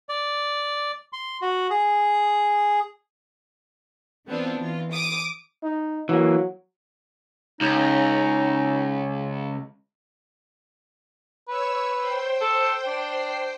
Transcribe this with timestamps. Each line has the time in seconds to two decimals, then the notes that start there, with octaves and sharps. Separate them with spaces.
0.09 D5
1.13 C6
1.42 F#4
1.70 G#4
4.26 E3 B3 C4 D4 F4
4.59 E3 F4
4.92 D6 D#6
5.63 D#4
6.09 E3 F#3 A#3
7.61 C#2 C#4 D#4
11.48 B4 C#5 E6
11.98 C5 G5 C6
12.41 A4
12.87 D4